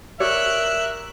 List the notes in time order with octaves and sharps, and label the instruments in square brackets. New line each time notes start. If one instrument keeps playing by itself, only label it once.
[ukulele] G4 C#5 D5 [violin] A#4 F#6 [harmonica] E5